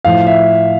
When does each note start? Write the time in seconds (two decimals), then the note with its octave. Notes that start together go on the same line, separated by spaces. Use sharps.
0.05 A2 F3 F5
0.27 E5